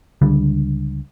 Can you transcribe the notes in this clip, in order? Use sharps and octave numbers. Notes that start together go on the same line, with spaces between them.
C#2 D3 G3